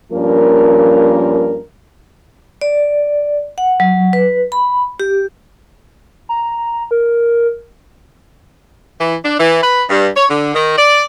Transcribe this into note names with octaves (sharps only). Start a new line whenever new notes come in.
G2 F3 A#3 C#4 A#4
D5
F#5
F#3
B4
B5
G4
A#5
A#4
E3
D4
E3
B4
G2
C#5
D3
D#3
D5